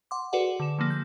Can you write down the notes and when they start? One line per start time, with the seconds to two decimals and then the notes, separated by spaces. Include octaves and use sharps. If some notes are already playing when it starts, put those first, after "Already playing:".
0.11 F#5 C6 D6
0.33 F#4 G#4 A4 B4 D5 F#5
0.60 D3 E7
0.79 D3 F3 A#3
0.90 G6